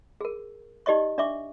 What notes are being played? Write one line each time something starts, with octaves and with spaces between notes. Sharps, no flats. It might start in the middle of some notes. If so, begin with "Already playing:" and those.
G#4 A#4
D#4 G4 D5 D#5 C#6
D4 D5 E5 C#6 D6